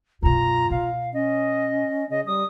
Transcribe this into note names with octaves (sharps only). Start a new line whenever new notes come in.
F#2 B2 F4 A#5
B2 F5
C#4 D#5
C#3 D#5
G3 D#6